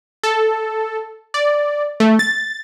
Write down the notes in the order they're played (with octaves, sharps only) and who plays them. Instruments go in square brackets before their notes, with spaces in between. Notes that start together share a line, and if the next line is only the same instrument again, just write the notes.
[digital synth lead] A4
D5
A3
A6